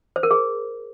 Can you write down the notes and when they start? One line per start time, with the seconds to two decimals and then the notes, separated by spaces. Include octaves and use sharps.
0.16 C5
0.23 A#4
0.31 G#4